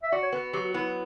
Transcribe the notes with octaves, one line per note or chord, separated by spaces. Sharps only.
E5
F#4 D5
C#5
B3 B4
F#3 G4
F#4
B3 E4
E4